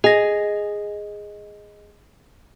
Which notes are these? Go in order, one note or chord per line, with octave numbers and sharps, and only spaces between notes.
G#4 D#5 A#6